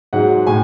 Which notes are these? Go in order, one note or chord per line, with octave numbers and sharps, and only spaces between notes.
G#2 F#3 F#5
A2 G#5